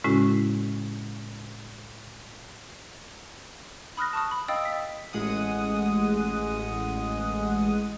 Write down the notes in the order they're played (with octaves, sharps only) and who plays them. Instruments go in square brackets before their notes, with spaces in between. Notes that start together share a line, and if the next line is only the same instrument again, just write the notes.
[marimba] A2 C#3 G#3 C#4 E4 F#4
[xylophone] B5 D#6 F6 F#6 A#6
A5 C#6 D#6
B5
D#5 F5 G5 D#6 E6 A6
B6
[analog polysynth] A1 G#3 F#5 D#6